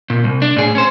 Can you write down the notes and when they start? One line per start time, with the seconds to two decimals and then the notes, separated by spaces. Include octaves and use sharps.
0.10 A#2
0.24 C2
0.42 D4
0.56 A2 G#4
0.75 C#4 C5